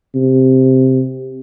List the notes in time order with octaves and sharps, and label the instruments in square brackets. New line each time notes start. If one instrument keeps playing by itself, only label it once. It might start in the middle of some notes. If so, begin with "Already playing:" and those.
[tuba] C3